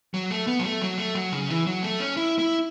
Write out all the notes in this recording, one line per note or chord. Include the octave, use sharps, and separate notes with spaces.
F#3
A3
B3
F#3
A3
F#3
A3
F#3
C#3
E3
F#3
A3
C#4
E4
E4